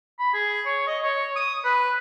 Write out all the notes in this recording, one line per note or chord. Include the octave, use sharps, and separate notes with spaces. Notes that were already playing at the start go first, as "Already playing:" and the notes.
B5
G#4
C#5
D#5
C#5
D#6
B4